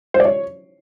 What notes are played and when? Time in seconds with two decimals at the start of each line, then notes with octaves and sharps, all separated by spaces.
0.14 C5
0.20 D5
0.25 C#5